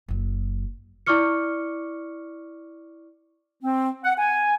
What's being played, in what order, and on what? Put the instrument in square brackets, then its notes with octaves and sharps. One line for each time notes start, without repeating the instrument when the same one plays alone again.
[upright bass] F#1 F#3
[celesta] E4 D5 C#6 D6 F6 C#7
[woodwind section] C4
F#5
G#5